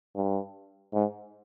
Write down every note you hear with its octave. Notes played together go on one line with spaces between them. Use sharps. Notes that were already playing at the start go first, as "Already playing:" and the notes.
G2
G#2